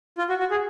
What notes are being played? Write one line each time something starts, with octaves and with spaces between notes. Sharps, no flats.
F4
F#4
F#4
G#4